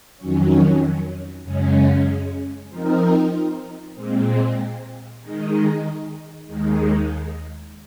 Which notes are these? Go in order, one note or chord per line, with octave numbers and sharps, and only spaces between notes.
F2 D#3 F#3 C#4
F#2 C#3 G#3 C#4
F3 C4 D#4 A#4
A#2 G#3 C4
D#3 G#3 D#4
D#2 D#3 G#3